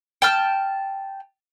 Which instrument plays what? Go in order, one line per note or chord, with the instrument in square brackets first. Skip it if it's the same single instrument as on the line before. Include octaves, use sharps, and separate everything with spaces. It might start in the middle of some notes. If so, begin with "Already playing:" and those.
[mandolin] G5 A5 F6